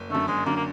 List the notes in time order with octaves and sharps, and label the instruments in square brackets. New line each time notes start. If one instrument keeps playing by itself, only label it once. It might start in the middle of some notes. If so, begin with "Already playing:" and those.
Already playing: [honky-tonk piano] F#1
[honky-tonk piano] F#2 D3 [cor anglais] A3
[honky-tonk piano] F#1 [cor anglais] G#3
[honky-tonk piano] F#2 D3 [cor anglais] A#3
[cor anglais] A#3